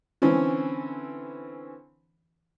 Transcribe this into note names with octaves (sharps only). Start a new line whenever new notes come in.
D3 E3 C4 C#4